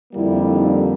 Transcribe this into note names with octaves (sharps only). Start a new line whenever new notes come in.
F2 D3 G3 A#3 E4
D#4